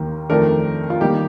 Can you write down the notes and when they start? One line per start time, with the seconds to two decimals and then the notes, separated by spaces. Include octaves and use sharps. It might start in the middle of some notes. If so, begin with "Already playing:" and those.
Already playing: D#2 D#3 A#3
0.29 F2 D#3 A3 D4 A#4
0.90 F4
1.01 D#3 G3 A#3 D#4 G4